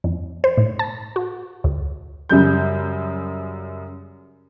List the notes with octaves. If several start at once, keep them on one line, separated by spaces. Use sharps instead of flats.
F2
C5
A2
A5
F#4
D2
F#2 C#3 G3 G6